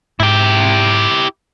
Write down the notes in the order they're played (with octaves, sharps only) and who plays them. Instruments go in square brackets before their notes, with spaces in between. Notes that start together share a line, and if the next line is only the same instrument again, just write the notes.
[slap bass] G#2 [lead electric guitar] E4 G4